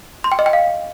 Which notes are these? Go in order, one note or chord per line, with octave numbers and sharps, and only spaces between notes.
C6
G5
D#5
G5
F5